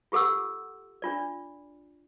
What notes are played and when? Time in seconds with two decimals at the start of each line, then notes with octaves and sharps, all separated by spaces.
0.12 F4 G4 A4 F#5 E6
1.02 D4 F4 D5